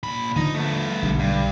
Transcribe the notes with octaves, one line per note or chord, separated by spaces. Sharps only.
A#2 B5
D3 F3 D#4 D#5
A3 B3
B1 D3 G3
G2